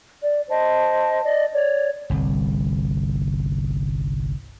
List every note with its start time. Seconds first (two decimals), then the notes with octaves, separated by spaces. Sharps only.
0.22 D5
0.49 C5 D#5 A5
1.24 D5 D#5
1.53 C#5 D5
2.10 G1 C2